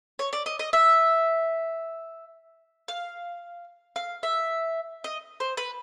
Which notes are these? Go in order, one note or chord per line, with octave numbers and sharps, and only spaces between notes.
C#5
D5
D#5
D#5
E5
F5
F5
E5
D#5
C5
B4